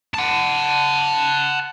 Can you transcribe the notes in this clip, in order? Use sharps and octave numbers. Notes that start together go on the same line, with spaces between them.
F#5 A5